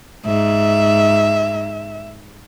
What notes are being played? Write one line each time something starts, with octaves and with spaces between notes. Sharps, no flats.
G#2 E5